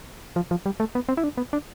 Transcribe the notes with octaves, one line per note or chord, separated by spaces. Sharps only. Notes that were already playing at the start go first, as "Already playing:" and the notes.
F3
F3
G3
A3
B3
C4
E4
D4
B3
D4